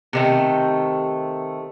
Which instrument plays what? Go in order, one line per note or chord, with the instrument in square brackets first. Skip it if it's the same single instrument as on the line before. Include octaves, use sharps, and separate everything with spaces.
[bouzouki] C3 D#3 A3